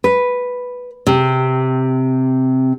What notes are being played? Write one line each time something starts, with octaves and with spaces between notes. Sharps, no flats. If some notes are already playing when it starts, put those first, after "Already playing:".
B4
C3